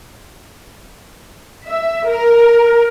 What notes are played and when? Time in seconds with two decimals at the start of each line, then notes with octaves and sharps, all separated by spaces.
1.66 E5
2.07 A#4